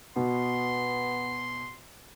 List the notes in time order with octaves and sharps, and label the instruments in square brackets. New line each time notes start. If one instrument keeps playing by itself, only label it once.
[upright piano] B2 [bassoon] B3 [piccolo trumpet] C6